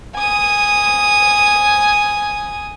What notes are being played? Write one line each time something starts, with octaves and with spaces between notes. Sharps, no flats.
G#5 D#6